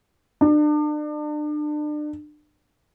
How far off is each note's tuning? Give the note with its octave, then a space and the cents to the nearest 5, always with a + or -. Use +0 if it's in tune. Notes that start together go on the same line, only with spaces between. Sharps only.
D4 +35